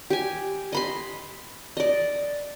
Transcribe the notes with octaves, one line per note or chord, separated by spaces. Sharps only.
G4 G#5
D#5 B5 C6
D5 D#5